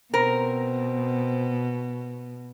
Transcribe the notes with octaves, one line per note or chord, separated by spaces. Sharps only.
B2 C4 A#4